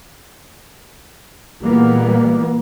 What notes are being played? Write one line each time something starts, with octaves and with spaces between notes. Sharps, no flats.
A#2 E3 G3 G#3 A#3 B3